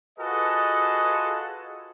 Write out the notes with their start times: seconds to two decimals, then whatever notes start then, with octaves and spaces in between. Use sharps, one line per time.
0.19 F4 F#4 G#4 A4 B4 D#5